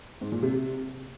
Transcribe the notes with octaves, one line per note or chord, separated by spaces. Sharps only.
G#2
A#2
C3
C3